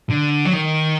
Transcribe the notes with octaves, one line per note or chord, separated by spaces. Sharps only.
D3
F#3
D#3